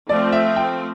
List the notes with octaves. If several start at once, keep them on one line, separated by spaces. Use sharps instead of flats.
F3 A3 C4 D5
E5
G5